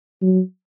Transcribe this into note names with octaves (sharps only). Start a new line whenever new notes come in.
F#3